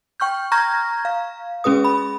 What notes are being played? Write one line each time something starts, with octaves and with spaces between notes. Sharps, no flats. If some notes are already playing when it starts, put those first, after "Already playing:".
G5 C#6 F6 G6
A#5 C#6 F6 G6 G#6 A#6
F5
G#3 C#4 G#4 B4 D#6
B5